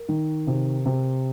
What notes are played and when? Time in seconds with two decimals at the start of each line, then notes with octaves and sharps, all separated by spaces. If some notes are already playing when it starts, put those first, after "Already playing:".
Already playing: A#4
0.08 D#3
0.47 C3
0.85 C3